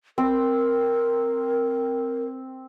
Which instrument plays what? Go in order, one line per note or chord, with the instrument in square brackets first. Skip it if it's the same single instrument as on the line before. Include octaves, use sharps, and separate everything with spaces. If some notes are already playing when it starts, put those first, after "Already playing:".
[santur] C4 [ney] A#4